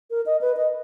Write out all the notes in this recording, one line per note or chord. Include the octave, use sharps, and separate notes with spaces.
A#4
D#5
B4
D#5